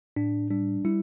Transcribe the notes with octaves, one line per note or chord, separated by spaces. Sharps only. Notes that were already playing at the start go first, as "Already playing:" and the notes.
A2 D4
G3 D4
G3 E4